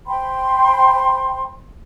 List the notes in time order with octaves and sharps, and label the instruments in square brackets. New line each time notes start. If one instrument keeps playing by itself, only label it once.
[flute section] C5 G5 B5 C6